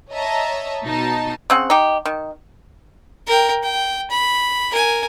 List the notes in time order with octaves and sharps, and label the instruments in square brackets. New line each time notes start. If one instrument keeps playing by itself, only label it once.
[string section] C#5 D#5 E5 A5 A#5
B2 D#4 A5
[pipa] C#3 C4 F#5
D#4 G4
D#3
[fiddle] A#4 G5
G5
B5
A#4 G#5